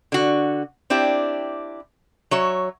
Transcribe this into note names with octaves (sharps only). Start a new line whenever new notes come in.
D3 F#4
C4 D4 E4 G4
F#3 C#5 E5